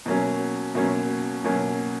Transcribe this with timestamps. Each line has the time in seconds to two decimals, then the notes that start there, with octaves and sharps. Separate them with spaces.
0.06 B2 F#3 A#3 C#4
0.75 B2 F#3 A#3 C#4
1.44 B2 F#3 A#3 C#4